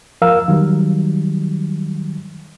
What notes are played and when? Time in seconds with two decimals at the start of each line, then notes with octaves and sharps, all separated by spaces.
0.22 F2 F3 A#4 F5 E6
0.48 D#3 F#3 G3